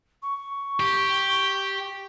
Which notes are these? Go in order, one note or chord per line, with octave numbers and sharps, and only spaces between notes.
C#6
G4